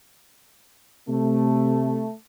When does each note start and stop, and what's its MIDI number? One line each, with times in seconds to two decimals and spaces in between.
1.09 2.07 48
1.09 2.12 57